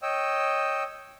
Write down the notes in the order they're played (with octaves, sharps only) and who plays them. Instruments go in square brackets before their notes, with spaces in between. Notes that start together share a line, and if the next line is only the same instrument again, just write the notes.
[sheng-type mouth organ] C#5 D#5 G5 E6